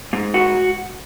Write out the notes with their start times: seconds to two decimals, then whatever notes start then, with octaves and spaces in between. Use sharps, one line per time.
0.13 G#2
0.34 F#4